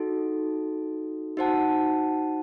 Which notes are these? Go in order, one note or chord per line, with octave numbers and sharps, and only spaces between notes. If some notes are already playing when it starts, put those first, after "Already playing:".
Already playing: D#4 F#4 A4
D#4 F#4 C5 F#5 A5